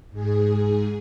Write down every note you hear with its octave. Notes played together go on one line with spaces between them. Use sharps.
G#2 G#4